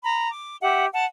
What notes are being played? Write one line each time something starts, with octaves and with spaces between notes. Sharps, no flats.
A#5 B5
D6
G4 E5 F#5
F#5 A5